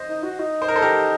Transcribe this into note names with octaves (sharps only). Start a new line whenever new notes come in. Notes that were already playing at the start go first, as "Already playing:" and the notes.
Already playing: C5 D#5
D#4
F#4
D#4
C5
A#4
A4 C5
G4 A#4